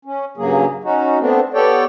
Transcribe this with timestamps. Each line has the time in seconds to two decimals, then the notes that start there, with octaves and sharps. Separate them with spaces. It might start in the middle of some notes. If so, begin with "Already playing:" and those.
0.05 C#4
0.37 G2 C#3 F#3 A#3 G#4
0.84 C#4 D#4 F#4
1.19 A3 B3 C4 D4
1.54 B3 G4 A4 C#5 D5 G5